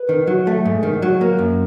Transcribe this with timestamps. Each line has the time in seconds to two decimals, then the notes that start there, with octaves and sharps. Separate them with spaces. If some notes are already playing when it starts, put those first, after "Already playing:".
Already playing: B4
0.09 D#3
0.27 F#3
0.47 A3
0.65 G#2
0.83 D#3
1.02 F#3
1.21 A#3
1.39 F#2